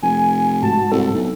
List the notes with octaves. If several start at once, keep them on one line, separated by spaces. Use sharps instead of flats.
F1 G#5
G#2 F#4 A5
C2 A4
B1